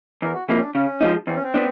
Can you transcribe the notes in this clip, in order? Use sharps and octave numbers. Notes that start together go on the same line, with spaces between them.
E2 A#4
F#4
C3 F3 A#3 E4
C#4
D4
C#3 C#4
F3 G#3 B3 D#4
E2 C4
C#4
C4
B3 D4